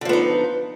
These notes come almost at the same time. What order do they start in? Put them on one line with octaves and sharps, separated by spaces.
D3 F3 B3 D#4